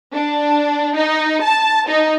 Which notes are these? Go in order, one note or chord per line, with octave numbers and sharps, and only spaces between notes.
D4
D#4
A5
D#4